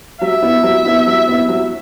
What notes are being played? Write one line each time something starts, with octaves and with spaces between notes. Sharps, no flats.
F#3 E5
B3 E4
F#3
B3 E4
F#3
B3 E4
F#3